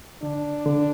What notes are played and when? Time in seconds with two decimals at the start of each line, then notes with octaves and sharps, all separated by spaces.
0.23 D3 D4
0.66 D3